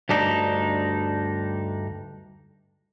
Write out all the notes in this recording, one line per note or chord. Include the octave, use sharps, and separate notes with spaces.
D2 G2 D4 D#4